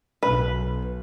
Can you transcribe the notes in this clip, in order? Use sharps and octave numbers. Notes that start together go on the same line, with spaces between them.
B1 B4